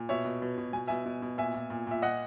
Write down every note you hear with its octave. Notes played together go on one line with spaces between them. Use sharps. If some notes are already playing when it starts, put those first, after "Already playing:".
Already playing: A#2
B2 C#5 E5
B2
B2
B2
B2 G#5
B2 E5 G#5
B2
B2
A#2 E5 G#5
A#2
A#2
A#2 E5
A#2 D#5 F#5